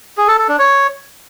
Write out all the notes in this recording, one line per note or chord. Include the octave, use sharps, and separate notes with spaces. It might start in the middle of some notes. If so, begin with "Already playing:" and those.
G#4
A4
A4
D4
C#5